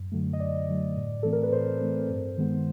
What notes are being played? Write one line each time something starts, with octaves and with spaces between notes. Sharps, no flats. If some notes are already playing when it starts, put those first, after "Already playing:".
Already playing: F#2
D3 F#3 A3
D#5
F#2 D5
D3 F#3 A3
A2
E3 A3 C4 A4
A#4
B4
A2 C5
E3 A3 C4
G2
D#3 G#3 B3